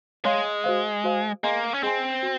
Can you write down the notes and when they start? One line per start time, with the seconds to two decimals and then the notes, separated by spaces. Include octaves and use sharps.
0.25 G#3 C#5 F5 C6
0.64 F#4 C5 F5
1.04 F#4 C5 F5
1.43 A#3 G#4 D#5 G#5 C6
1.74 C#4
1.83 C4 G#4 D#5 G#5 C6
2.23 F#4